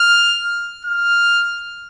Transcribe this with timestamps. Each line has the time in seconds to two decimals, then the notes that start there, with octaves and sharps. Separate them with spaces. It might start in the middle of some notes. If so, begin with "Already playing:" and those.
Already playing: F6
0.85 F6